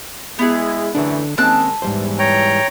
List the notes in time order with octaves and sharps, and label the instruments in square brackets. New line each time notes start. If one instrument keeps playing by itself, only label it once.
[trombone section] G#3 E4 [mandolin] B3 D#4 G#4
[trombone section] F#2 E3 A3 [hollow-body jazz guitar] D3 D4
[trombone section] D#3 G#3 [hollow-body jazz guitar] A#3 C4 C#4 [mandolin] A5 E6 F#6
[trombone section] E2 E3 [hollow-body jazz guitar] G#2 G3 C5
[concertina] C#5 G5 A#5